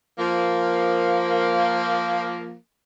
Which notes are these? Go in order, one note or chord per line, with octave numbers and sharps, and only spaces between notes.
F3 A#3